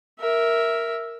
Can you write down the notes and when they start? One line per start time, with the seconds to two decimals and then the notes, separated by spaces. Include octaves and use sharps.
0.20 A#4 E5